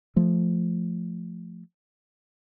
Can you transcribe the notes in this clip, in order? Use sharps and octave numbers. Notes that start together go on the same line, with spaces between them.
F3 A3